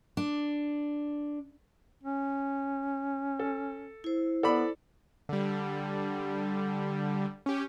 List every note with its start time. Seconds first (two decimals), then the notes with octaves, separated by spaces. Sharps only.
0.17 D4
2.03 C#4
3.39 A4
4.04 E4 C5
4.43 B3 A4 D5 B5
5.29 D3 G3
7.46 C#4 G4